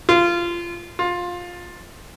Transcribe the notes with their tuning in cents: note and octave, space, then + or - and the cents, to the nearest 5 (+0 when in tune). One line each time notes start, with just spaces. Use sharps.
F4 -20
F4 +15